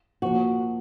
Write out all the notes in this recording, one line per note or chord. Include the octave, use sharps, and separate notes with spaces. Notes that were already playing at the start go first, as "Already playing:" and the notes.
A#2 F3 A#3 F#4